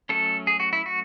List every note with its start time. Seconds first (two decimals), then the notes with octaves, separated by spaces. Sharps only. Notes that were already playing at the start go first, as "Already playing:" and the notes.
0.09 F#3 A3 C#4 A4
0.47 G#4
0.60 F#4
0.73 E4
0.86 F#4